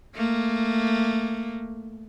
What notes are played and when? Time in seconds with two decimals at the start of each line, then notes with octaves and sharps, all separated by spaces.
0.15 A3 A#3